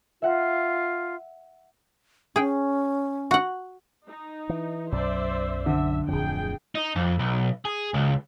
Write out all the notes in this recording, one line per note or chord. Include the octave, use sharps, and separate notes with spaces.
F4 E5 F#5 A#6
C#4 G#4 G5
F#4 F#5
D#4
E3
B1 F#2 C5 D5 E5
D3 E5
D1 F2 G#4 G5
D#4
F2
B1
G#4
C#2